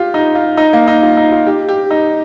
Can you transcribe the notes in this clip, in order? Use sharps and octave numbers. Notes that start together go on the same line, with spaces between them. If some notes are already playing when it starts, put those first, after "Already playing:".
Already playing: F4 G4
D#4
F4
D#4
A#3
D#4
F4
D#4
F4
G4
G4
D#4